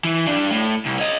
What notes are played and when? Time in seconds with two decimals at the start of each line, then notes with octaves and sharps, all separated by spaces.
0.04 E3
0.27 G2 D4
0.51 A2
0.86 C2
1.00 C#5 D#5